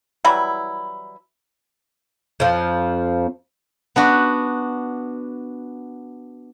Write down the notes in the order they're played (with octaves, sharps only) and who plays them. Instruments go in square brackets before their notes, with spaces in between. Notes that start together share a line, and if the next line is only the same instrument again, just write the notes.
[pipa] E3 F#3 G3 E4
[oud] F2 F3
[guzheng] B3 D4 F#4